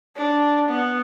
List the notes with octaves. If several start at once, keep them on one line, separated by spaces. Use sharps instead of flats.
D4
B3